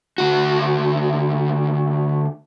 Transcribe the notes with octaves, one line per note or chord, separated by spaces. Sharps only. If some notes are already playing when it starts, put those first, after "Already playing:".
D2 F#4